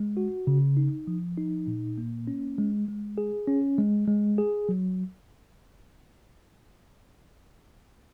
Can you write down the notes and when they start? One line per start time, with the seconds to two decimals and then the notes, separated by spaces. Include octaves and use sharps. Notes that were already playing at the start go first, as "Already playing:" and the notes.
Already playing: G#3
0.17 F#4
0.47 C#3
0.77 D#4
1.07 F3
1.37 D#4
1.67 A#2
1.98 A#3
2.27 C#4
2.58 G#3
2.88 G#3
3.18 G#4
3.47 C#4
3.78 G#3
4.08 G#3
4.38 G#4
4.69 F#3